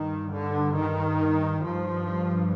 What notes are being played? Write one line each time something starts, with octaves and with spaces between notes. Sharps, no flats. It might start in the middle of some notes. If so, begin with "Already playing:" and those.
Already playing: G2 D#3
D3
D#3
G2 F3